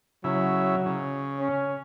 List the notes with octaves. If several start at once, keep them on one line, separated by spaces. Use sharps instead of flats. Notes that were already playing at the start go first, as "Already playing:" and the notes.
C#3 F#3 E4
C#3
C#4